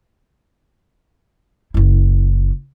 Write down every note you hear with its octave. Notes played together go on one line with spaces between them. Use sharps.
F#1 E4